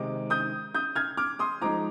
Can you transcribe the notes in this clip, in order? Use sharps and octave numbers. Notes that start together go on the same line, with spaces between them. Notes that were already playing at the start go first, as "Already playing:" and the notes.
Already playing: C3 D#3 G#3 D#4 D6
D#6 G6
D#6 G6
F6 G#6
D6 F6
C6 D#6
F3 G#3 D#4 A#5 D6